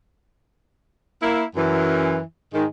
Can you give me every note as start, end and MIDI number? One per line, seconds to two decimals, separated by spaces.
1.21 1.44 58
1.21 1.44 64
1.56 2.19 42
1.56 2.19 52
2.54 2.65 44
2.54 2.65 51